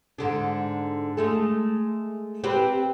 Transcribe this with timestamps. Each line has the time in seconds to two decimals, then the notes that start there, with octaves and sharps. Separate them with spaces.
0.18 G#2 D3 D4
1.17 G#3 A3 A4
2.44 C4 G4 B4